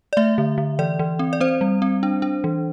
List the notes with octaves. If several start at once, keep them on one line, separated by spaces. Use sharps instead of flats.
D5
A3 E5
D3
D3
E3 D5
E3
C4
D5
C4 C5
G3
C4
D4
D4
E3